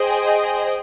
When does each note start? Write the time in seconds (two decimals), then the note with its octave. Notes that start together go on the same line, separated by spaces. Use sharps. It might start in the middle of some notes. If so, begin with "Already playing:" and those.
Already playing: G#4 C5 D#5 G5